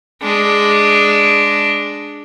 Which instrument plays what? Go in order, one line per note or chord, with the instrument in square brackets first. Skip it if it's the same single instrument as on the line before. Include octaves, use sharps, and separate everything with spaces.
[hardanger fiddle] G#3 D4